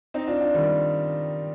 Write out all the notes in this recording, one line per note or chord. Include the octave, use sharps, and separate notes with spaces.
C4 D#4
D4 F4
D4 F4
D#3 G3